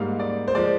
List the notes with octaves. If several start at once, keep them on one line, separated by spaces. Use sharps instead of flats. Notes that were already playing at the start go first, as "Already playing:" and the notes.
Already playing: G#2 G3 A#3 D#4 F5
D5
C5
F3 G#3 D5